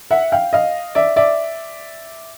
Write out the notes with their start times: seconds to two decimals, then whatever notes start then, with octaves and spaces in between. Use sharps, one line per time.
0.11 E5 F#5
0.32 F5 G5
0.53 D#5 F5
0.95 D5 E5
1.16 D5 E5